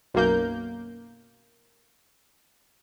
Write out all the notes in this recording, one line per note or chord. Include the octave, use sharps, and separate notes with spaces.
B1 F#2 A#3 G6